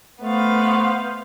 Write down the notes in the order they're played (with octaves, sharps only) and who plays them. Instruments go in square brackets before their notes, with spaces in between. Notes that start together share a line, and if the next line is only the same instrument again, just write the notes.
[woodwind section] A3 [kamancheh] B3 F5 [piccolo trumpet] C5